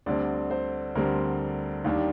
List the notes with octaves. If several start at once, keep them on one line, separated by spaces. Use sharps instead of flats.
D2 D3 G3 C4 D5
C5
D2 D3 G3 C4 A#4
D#2 D#3 G3 D4